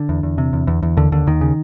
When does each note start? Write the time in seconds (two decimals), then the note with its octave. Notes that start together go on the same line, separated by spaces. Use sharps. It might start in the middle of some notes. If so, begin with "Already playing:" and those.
Already playing: D3
0.09 E2
0.23 E2
0.38 C3
0.53 E2
0.67 E2
0.83 E2
0.97 D#2 D3
1.12 D#2 D3
1.27 D#2 D#3
1.41 C#3